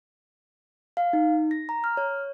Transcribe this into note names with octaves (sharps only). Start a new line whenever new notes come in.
F5
D#4
A#6
A#5
F6
C#5